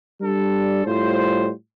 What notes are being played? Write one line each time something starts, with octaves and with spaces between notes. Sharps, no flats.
G3 D4 A4
A2 G3 F4 C5